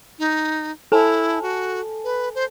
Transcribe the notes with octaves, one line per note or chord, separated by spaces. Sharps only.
D#4
E4 A4 G#5 A5
F#4
B4
C5